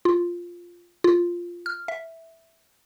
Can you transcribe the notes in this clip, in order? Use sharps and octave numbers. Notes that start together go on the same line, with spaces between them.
F4
F4
F6
E5